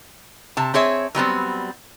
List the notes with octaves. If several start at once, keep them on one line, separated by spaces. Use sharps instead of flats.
C3 A5
C4 G#4 C#5 E5
F#3 G3 B3 C4